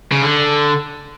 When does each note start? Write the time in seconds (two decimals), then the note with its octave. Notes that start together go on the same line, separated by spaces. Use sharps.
0.12 C#3
0.22 D3